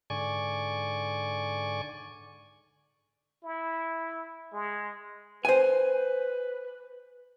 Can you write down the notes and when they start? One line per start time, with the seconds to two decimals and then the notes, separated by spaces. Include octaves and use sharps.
0.10 G#2 D3 D5 G#5 C#6
3.43 E4
4.53 G#3
5.45 B4 C5 G#5